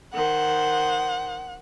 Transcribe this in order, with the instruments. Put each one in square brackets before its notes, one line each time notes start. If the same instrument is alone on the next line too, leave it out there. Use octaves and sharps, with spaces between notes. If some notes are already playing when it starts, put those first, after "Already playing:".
[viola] D#3 C5 [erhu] F#5